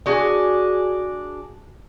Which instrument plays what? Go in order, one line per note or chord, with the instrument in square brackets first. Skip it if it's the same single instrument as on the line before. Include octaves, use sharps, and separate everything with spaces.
[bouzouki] D4 F#4 G#4 G#5